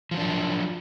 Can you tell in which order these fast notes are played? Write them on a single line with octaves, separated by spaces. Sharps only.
F3 F#3 D4